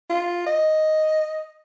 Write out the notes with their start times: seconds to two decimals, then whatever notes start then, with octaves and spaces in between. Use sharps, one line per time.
0.10 F4
0.46 D#5